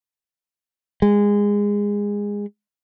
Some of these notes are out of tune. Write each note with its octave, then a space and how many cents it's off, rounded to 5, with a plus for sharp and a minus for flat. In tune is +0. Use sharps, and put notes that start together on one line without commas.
G#3 -20